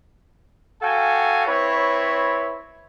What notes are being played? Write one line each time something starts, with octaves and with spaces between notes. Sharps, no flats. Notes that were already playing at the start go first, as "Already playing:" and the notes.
F#4 A4 F5 G5 G#5
C4 E4 B4 C#5